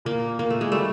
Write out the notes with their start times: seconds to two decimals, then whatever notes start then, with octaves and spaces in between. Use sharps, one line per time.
0.05 A#2 A#3
0.39 A#2 A#3
0.50 A3
0.61 G#3
0.72 G3 A3